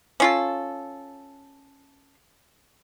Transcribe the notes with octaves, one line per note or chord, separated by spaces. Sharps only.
C#4 F4 A4